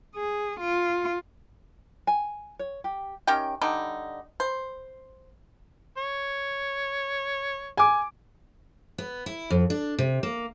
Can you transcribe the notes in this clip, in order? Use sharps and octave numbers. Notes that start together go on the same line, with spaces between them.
G#4
F4
G#5
C#5
G4
D#3 C#4 G4 G5
D3 G3 D#4
C5
C#5
G#5 D6
B3
E4
F2
D4
C3
A#3